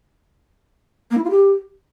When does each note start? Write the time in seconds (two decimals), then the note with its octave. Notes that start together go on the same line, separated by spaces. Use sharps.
1.11 A#3
1.17 E4
1.24 F4
1.31 G4